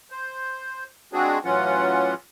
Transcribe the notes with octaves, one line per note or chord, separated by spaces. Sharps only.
C5
G#3 C4 D4 F#4 G#4
A2 E3 F#3 C#4 F4 F#5